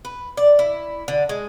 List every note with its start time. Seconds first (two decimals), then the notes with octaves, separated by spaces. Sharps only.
0.05 B4
0.37 D5
0.59 E4
1.08 D3
1.29 G#3